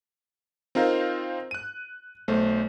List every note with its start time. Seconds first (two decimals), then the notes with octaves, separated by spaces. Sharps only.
0.75 C4 D#4 F4 A#4 C5 F5
1.51 F#6 D#7
2.28 B1 A3 C5